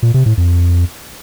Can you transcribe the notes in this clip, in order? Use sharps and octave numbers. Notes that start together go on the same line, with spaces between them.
A#2
C3
A2
F2